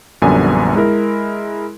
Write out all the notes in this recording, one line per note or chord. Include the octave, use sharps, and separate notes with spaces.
A#1 F#2 D3 G3 B3 G#5
G#3 E4 A#4